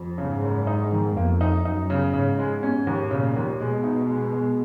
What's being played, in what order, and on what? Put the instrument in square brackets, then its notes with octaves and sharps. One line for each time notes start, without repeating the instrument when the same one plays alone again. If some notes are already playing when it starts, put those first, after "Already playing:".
Already playing: [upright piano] F2
[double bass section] G#2 [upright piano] C#3
[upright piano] F#1
D#4
D#3
[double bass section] F2 [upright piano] A#3
[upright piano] D#4
[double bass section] F#2 [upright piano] D#4
[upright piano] C#3
[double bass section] G#2 [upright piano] C#3
[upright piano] G#3
C#4
D#2
[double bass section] A#2 [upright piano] C#3
[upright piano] D#2
[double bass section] B2 [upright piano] G#3
[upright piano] D#4
G#3
G#3